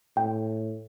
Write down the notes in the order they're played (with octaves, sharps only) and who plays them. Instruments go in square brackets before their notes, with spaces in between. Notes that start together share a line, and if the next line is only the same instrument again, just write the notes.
[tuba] A2 [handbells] G5